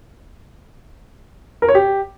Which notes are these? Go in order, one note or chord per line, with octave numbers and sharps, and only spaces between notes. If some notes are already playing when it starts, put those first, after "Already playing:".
A#4
C#5
G4